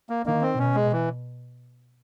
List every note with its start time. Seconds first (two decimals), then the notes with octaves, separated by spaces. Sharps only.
0.10 A#3
0.25 D#3 A#3
0.41 C4
0.58 B2 C#4
0.75 G#3
0.92 E3